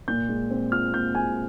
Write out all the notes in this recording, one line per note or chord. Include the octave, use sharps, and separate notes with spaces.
A#2 G6
G#3
C4
F4 F6
A#2 G6
G#3 G#5